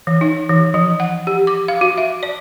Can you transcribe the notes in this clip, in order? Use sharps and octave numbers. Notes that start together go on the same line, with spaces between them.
E3
D#4
E3
F3
F#5
G4
D6
F5
F#4
E5
D5